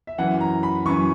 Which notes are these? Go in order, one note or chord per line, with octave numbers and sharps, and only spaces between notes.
E5
F#2 E3 F#5
A#5
B5
F#2 E3 C#6